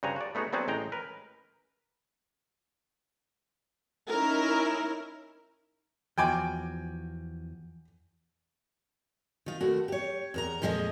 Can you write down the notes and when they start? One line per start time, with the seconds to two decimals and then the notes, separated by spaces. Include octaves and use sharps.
0.03 G2 C#3 F#4 C5 G#5 A#5
0.16 F#4 D5
0.35 A3 B3 D#4 F#4 G#4
0.53 F#3 B3 C4 D4 F#4 G#4
0.68 A1 G#3 G5 A#5
0.92 A#4 B4
4.09 C#4 D#4 E4 A#4
6.18 E2 F3 F#4 G5 G#5 D6
9.46 D#3 F4
9.61 D#2 A3 F#4
9.88 G4 C#5
10.34 E2 A#4 A#5
10.62 F2 A#2 F3 G#3 G4 D#5